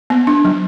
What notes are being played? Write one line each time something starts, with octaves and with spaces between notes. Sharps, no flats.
B3
D4
F#3